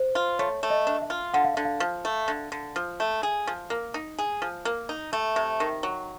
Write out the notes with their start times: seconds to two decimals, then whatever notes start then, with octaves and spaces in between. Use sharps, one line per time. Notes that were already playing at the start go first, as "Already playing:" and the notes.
Already playing: C5
0.15 F4
0.39 A3 C#5
0.63 A3
0.70 D#5
0.87 D4
1.02 E5
1.10 F4
1.34 D3 F#5
1.44 F5
1.54 D3 E5
1.65 F5
1.80 F3
2.05 A3
2.28 D3
2.52 D3
2.76 F3
3.00 A3
3.23 G#4
3.47 F3
3.70 A#3
3.94 D#4
4.19 G#4
4.42 F3
4.65 A#3
4.89 D#4
5.13 A3 E5
5.36 C3
5.60 D#3
5.83 F#3